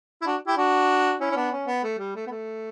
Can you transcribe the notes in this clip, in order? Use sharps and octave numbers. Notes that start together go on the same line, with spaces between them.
E4
D4 F#4
E4 G4
D4 F#4
C#4 E4
C#4
B3 D4
C#4
B3
A3
G3
A3
B3
A3